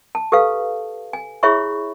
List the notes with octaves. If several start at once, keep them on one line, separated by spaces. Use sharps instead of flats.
A5
G4 A4 B4 F5
G#5
E4 G#4 C#5 E5 B5 C#6